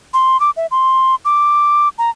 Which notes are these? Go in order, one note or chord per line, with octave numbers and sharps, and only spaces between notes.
C6
D6
E5
C6
D6
A#5